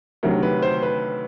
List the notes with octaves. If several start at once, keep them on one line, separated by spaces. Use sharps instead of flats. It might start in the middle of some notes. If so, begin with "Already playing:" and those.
D2 C3 D#3 F#3 A#4
B4
C5
B4